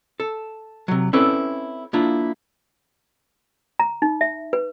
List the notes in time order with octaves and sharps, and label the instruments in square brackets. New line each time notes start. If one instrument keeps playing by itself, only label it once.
[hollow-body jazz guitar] A4
C3 F#3
C4 C#4 E4 A4 B4 D5
A#3 D4 E4 F4
[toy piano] A#5
D#4
E5
B4